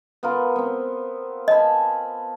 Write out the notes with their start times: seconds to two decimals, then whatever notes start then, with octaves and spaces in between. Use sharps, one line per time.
0.23 B3 F4 A#4
0.56 B3 C4
1.48 D#5 G#5 A5 B5